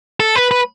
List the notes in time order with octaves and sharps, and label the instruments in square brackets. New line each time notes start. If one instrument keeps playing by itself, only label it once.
[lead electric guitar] A4
B4
B4